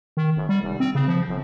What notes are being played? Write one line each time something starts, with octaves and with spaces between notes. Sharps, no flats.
D#3
G1
G3
F1
C4
C#3
F3
G1